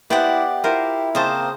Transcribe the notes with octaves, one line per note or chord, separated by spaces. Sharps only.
B3 E4 G4 C5 D5 F#5 G5
E4 F4 A#4 C5
C#3 A#3 C4 A#4 C5 D#5 A5